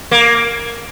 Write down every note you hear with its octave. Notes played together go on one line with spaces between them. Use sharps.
A#3